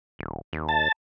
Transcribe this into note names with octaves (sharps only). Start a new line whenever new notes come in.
D#1
D#2
A5